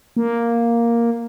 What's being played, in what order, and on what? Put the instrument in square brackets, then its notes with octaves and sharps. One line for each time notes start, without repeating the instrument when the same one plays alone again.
[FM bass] A#3